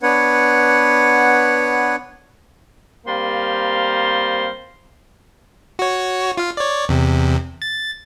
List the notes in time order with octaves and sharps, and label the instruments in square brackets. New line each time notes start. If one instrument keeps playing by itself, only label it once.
[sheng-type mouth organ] B3 D4 B4 C#5 F#5
[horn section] G3 A#3 C4 C5 F5 A#5
[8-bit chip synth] F#4 C#5
F4 F5
C#5 D5
E2 C3
A6